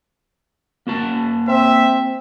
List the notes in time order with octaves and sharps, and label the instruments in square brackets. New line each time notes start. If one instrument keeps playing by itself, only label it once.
[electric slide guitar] A#3 F#4 A5
[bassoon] C4 [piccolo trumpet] E5